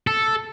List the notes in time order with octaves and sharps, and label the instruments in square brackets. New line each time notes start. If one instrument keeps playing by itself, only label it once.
[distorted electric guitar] A4